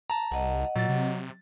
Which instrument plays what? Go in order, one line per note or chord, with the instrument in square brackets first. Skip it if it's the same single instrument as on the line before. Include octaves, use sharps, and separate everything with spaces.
[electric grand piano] A5 A#5
[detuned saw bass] C2 [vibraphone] D#5 F#5
[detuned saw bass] A#2 [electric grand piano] F#3 A6
[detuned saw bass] C3